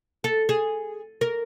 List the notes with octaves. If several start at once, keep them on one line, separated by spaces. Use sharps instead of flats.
A4
G#4
A#4